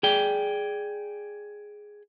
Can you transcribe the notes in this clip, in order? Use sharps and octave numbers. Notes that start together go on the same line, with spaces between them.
G#4 D5 G5